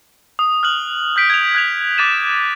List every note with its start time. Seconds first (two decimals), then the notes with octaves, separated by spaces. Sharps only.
0.39 D#6
0.63 F6 F#6 F#7
1.16 F6 G6 B6 D7
1.30 G#6 F7
1.55 F#6 G#6 F7
1.98 D6 F#6 A6 D#7 E7